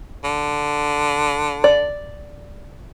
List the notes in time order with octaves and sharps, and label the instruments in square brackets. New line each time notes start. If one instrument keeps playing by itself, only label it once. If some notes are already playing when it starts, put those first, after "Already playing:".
[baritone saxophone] D3
[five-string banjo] D5